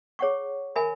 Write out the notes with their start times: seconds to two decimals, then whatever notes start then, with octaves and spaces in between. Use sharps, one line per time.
0.19 G#4 C#5 F#5 C#6
0.76 A#4 E5 G#5 B5